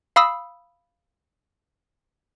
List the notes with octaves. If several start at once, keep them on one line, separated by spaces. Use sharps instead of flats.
F5 B5 D#6 E6